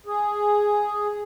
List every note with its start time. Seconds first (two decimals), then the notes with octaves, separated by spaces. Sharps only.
0.06 G#4